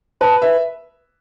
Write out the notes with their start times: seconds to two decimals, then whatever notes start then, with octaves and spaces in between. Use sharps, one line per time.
0.21 B4 A5
0.42 B4 E5